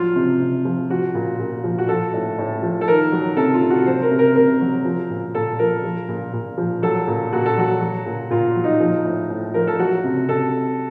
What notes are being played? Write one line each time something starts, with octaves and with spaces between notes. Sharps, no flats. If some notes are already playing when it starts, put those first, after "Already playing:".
Already playing: F3 F#3 F4
C3
C3
F3
F3 F#4
A#2
A#2
F3
F#4
F3 A4
A2
A2
F3
A4
D#3 A#4
F#3
C3 A4
F4
C3
F#4
F#3 C5
A#4
C3
A#4
C3 A#4
F#3
F3
A#2
A#2 A4
F3 A#4
F3
A#2
A#2
F3
F#3 A4
A#2
A#2 F#4
A4
F#3 F#4
F#3
A#2
A#2 F4
F#3
D#4
F3
A2
A2
F3 A#4
A4
F#3 F#4
C3
C3 A4